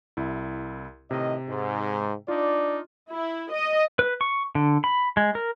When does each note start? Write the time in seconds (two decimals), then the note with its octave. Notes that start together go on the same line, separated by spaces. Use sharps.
0.17 C2 E4
1.11 A2 C3 D#3 D#5
1.48 G#2
2.28 D4 D#4 F4 D5
3.10 E4
3.52 D#5
3.99 B4
4.21 C#6
4.55 D3
4.84 B5
5.17 G#3
5.35 A#4